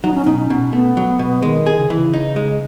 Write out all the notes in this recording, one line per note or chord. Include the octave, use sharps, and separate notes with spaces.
F#3 D#4
C#4
B2 D#4
C#4
B2
A3 B3
F#3
B2
D#3 G#3
G#4
C#3
E3
C#3
D#4
G#3